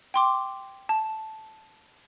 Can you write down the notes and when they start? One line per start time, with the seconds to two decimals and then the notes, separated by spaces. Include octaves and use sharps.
0.14 G5 C6 D6
0.89 A5